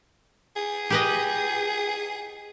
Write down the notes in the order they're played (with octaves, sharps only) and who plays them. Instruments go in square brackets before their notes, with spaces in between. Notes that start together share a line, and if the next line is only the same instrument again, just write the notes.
[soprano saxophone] G#4
[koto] G4 B4 D#5